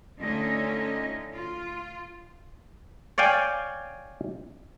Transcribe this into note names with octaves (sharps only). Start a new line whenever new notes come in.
D3 A3 C#4 D#4 F4 D#5
F4
C#5 D5 F5 G5 G#5